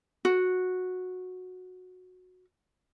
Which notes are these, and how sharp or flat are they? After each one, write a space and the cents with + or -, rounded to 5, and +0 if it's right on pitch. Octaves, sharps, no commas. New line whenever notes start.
F#4 -15